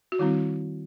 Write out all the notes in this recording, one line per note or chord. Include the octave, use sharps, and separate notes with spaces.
F#4
D#3 G3 C4 E4